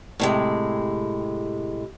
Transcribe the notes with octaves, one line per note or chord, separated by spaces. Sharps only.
A2 C3 G#3